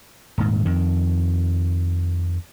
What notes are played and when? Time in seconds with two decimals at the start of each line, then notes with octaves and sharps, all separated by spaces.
0.38 D#1 G#2
0.65 F2 D#3